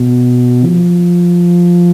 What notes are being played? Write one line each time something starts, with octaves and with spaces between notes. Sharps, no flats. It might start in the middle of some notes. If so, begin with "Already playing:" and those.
Already playing: B2
F3